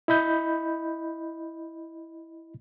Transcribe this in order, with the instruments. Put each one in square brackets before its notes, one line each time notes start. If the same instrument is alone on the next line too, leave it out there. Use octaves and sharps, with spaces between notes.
[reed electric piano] E4 D#5 B5 G6